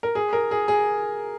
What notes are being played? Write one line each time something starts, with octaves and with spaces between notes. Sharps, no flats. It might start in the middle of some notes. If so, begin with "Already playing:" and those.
A#4
G#4
A#4
G#4
G#4